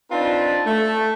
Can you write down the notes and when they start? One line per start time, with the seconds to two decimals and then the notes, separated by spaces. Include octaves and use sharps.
0.11 C4 D4 D#4 F4 B4 A5
0.66 A3